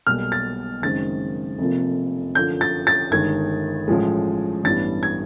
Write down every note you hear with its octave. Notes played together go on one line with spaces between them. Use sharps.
B1 B2 G3 A#3 F6
A6
F#1 F#2 D#3 G#3 C4 A6
F1 F2 C3 F3 A#3
F#2 D3 F3 G6
A6
A6
G1 G2 D#3 G#3 G#6
A1 A2 F3 G#3
A1 G2 E3 G3 B3 A6
G#6